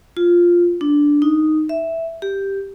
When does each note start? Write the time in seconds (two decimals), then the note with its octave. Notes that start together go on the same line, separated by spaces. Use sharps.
0.17 F4
0.81 D4
1.22 D#4
1.69 E5
2.22 G4